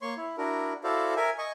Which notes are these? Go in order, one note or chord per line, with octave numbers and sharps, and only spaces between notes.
A#3 C#5 C6 C#6
E4
D4 E4 F#4 A#4
E4 F#4 A4 C5 D5 F5
A#4 E5 G#5
D#5 G#5 C#6